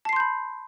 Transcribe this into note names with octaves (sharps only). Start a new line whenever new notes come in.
A5 B5 C6 G6 C7